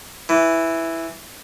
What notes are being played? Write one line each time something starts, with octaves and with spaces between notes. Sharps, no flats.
E3